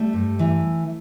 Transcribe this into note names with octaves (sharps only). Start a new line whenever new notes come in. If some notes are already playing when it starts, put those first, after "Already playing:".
Already playing: G3 A3
G2
E3